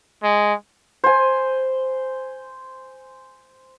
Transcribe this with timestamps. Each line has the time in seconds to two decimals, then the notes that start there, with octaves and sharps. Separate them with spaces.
0.23 G#3
1.04 C5 G#5